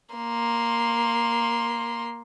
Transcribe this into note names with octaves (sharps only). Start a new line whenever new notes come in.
A#3 C6